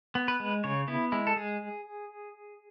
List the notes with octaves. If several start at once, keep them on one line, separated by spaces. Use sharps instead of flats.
B3
B4
G#3
C#3 C#5
B3 E4
G#3 E4
A4
G#3 G#4